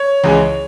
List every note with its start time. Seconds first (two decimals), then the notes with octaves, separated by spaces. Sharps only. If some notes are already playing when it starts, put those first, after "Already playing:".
Already playing: C#5
0.24 C#2 C#3 E3 G#3